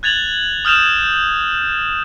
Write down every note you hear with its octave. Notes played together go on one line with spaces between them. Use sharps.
F#6 G#6 A6 F7 F#7
D#6 F6 G6 E7 F7